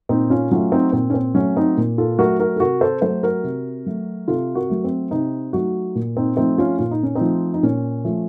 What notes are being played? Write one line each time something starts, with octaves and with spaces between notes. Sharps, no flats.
A#2 C4 D#4
C#4 F4
F#3 A3 C#4 F4
C4 D#4
A#2 C4
C#4
C4
F#3 A3 C#4
C4 D#4
A#2
F4 A4
F#3 A3 F#4 A#4
F#4 A#4
A4
C3 F#4 A#4
A4 C5
F#3 A3 A4 C5
F#4 A#4
C3
F#3 A3
C3 F4 A4
F#4 A#4
F#3 A3
C4
C3 C4 D#4
F#3 A3 D#4 F#4
A#2
C4 D#4
F3 A3 C4 D#4
C#4 F4
A#2 F4
D#4
C#4
C4 D#4
F3 A3
D#4
A#2 C#4
F3 A3